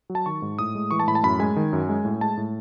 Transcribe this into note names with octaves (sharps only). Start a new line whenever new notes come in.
F#3
A5
D#3 C#6
G#2
A2 D#6
G#3
E3 C#6
A5
A2 B5
A5
F#2 B5
G#3 G#5
D#3
F#2
G#3
A2
G#3 A5
A2